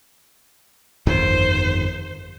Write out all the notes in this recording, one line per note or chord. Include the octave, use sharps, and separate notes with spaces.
G1 F2 D#3 C5